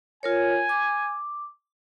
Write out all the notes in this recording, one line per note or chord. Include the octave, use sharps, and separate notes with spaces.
F4 A#4 C#5 G#5
D6